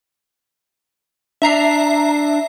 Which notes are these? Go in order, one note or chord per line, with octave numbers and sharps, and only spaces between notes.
D4 E5 A#5 C7